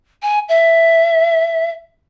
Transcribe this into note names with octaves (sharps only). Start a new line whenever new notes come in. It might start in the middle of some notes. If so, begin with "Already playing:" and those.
G#5
E5